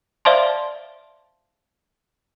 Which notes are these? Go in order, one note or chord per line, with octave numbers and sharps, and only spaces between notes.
C5 D5 E5 F5 A5 C6